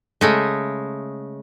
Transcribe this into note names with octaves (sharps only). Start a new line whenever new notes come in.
C#3 G#3 A3